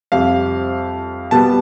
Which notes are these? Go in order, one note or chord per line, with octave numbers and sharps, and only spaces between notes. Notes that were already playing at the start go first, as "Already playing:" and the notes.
F2 C3 G3 F5
B2 G3 B3 A5